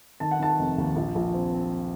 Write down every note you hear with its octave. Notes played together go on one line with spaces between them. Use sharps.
D#3 A5
F#5
D#3 A5
F1
D#2
A#1
A#1
C4
C4